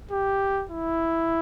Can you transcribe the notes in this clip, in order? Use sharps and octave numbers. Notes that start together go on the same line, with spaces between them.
G4
E4